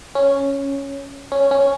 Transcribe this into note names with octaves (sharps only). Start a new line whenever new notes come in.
C#4
C#4
C#4